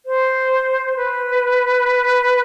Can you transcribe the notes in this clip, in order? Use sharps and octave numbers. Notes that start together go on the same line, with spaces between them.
C5
B4